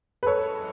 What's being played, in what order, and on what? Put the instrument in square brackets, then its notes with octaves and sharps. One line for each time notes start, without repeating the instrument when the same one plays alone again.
[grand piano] B4
[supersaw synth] F#2 E3 G#3 [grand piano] A4 C#5